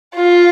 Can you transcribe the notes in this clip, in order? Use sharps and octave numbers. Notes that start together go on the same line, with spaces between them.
F4